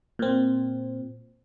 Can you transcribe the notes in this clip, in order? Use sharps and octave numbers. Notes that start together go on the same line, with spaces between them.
A#2 C4